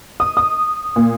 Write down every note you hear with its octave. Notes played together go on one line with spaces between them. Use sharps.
D#6
D#6
A#2